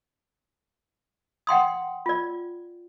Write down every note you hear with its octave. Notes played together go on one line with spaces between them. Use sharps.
F#5 G5 C6 D#6
F4 D5